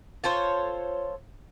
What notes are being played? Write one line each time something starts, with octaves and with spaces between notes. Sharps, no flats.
F4 A4 C5 C#5